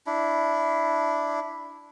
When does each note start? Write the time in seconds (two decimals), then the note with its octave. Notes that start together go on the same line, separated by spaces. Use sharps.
0.06 D4 E4